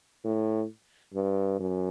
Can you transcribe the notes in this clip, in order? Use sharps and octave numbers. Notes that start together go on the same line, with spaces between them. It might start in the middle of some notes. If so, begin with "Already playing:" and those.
A2
G2
F#2